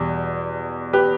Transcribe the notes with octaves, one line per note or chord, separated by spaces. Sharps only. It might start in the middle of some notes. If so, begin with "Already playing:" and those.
Already playing: E2 B2 G3
G4 B4